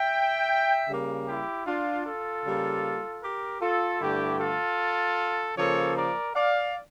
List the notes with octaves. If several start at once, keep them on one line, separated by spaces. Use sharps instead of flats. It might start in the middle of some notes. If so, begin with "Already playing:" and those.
Already playing: E5 G5
C#3 G3 A#3
E4 G4
D4 F4
F4 A4
C#3 G3 A#3
G4 A#4
F4 A4
G2 D3 A3 E4 G4
F4 A4
C#3 F3 A#3 A4 C#5
A#4 D5
D5 F5